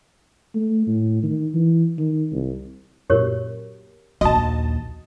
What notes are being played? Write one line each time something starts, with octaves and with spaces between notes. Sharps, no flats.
A3
A2
D#3
E3
D#3
C2
F#2 A#2 G4 A#4 C#5
A#1 D#2 F#4 D#5 A5